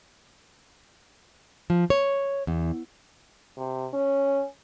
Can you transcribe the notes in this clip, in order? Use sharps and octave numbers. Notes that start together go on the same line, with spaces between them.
F3
C#5
E2
C3
C#4